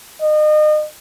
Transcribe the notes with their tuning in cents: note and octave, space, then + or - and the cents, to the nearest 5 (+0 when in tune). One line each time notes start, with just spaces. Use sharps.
D#5 -35